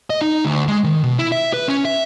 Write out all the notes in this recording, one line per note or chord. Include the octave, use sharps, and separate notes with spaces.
D#5
D#4
D2
G#3
D#3
B2
E4
E5
B4
C#4
E5